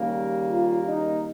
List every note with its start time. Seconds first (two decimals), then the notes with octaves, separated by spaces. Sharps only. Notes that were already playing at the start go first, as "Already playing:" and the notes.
Already playing: D#2 C#3 G3 A#3
0.49 F4
0.86 D#4